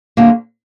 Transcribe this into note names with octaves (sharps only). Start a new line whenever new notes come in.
D2 D3 G3 A#3